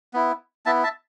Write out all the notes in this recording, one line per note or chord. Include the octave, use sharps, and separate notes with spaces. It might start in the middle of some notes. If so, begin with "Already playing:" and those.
B3 E4
B3 E4 E5 A5
E5 A5